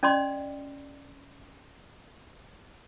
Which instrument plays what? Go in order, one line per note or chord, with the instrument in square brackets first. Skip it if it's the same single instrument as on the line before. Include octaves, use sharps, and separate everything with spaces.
[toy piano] C#4 D5 D#5 C6